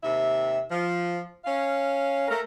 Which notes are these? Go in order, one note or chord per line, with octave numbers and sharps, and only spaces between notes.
D#2 C3 E5
F3
C#4 F5
A3 A#4